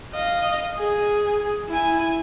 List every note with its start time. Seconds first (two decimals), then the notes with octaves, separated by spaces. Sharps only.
0.14 D#5 F5
0.79 G#4
1.69 E4 G#5